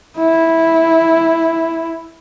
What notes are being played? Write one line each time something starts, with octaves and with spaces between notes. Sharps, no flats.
E4